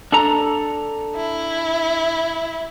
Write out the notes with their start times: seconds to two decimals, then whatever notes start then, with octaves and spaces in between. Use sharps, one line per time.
0.12 D4 A4 A#5
1.16 E4